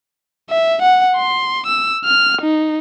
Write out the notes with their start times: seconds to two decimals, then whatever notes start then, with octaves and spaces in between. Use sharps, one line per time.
0.50 E5
0.82 F#5
1.17 C6
1.67 E6
2.05 F6
2.42 D#4